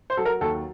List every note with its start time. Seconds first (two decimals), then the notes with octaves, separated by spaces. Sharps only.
0.10 C5
0.17 F#3 A4
0.25 A#4
0.41 D#2 A4